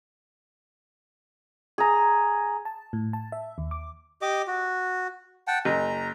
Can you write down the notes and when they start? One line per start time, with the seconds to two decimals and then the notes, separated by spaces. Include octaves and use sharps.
1.78 G#4 A#5
2.65 A5
2.93 A2
3.13 A5
3.32 E5
3.58 D#2
3.71 D6
4.22 G4 D#5 D6
4.47 F#4
5.47 F#5 G5 A5
5.65 F#1 A#5